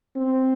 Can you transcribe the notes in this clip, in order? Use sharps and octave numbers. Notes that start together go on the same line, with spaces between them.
C4